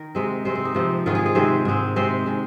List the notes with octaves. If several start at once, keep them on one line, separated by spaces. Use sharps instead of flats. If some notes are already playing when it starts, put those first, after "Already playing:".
Already playing: D#3 A#4
C3 G#3 C4
C3 G#3 C4 C5
C4
D#4
C3 F3 C4
G#2 D#3 G#3 F4
G#4
G#4
C3 D#3 G#3 C4 C5
G#2 G#3 C4
C3 G#3 C4 C5
D#3 G#3